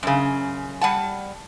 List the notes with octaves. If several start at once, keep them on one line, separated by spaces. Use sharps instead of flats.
F#2 C#3
G3 F#5 A5